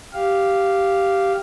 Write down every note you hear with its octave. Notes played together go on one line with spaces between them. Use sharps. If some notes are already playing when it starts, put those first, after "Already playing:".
G4 F5